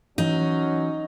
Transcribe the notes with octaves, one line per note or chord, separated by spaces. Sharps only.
E3 F#3 C#4 D#4